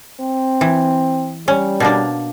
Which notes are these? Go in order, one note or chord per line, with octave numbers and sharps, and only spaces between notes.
C4
E3
G3 C#4
B2 A#3 D4